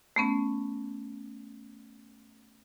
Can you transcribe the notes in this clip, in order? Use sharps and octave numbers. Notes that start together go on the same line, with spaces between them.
A3 B3 C#4